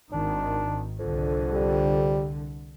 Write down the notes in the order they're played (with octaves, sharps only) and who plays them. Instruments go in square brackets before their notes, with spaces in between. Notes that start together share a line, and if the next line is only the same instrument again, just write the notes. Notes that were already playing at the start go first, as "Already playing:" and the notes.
[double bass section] G#1 D#3 [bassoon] D4
[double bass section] C2 D3 [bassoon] F2
[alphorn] G3